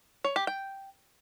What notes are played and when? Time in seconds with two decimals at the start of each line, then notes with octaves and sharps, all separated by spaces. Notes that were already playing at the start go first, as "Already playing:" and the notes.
0.24 C#5
0.36 G4
0.47 G5